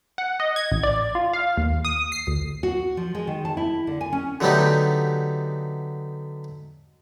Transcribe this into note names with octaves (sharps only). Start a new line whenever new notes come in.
F#5
D#5
G#6
A1
D5
F4
F5
D#2
D#6
C7
D2
F#4
F3
G#3
D#3
A5
E4
D3
G#5
C#4
D3 F#3 A3 B3 D#4 G4